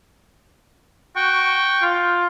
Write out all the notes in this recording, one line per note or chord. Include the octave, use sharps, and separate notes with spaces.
F#4 G5 C#6
F4